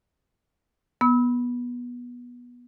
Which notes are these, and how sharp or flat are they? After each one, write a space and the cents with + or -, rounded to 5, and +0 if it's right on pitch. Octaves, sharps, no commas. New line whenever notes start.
B3 -20 E6 -35